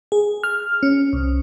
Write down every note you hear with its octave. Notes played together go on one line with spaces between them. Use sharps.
G#4
F6
C#4
C2